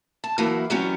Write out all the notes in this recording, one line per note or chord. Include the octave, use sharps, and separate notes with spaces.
A5
E3 F#3 A#3 E4
E3 F#3 G3 B3 C#4